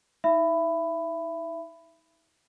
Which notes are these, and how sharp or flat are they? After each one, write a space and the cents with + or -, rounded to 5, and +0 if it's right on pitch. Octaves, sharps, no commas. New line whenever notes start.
D#4 +35 E5 +20 B5 +10